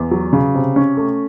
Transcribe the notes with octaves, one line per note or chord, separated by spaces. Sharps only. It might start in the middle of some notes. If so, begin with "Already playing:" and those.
Already playing: E2
F#3
C#3
C3
C#4
A3